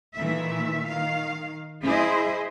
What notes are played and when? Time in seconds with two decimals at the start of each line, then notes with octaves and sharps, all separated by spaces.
0.15 A#2 D#3 E3 A3 E5
0.86 D#3 F5
1.84 E4 G#4 C5 D#5